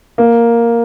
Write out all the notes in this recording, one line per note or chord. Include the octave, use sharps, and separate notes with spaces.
A#3